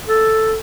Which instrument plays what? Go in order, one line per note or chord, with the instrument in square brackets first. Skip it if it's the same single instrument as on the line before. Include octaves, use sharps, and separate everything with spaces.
[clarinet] A4